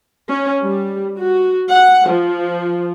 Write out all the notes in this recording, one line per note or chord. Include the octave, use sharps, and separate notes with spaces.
C#4
G3
F#4
F#5
F3